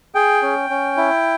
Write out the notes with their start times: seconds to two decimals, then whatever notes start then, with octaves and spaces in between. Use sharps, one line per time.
0.15 G#4 G5
0.42 C#4
0.70 C#4
0.97 E4